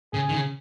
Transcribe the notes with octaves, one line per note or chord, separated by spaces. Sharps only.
C#3 G#4
D#3
C#3